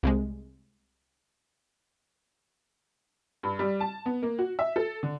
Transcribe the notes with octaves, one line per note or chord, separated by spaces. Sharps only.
C2 C3 G#3
G2
G3
A5
B3
A#3
F#4
E5
A4
D3